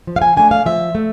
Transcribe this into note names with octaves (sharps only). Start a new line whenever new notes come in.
F3
F5
G#5
A3 D4 G#5
F5
F3 E5
A3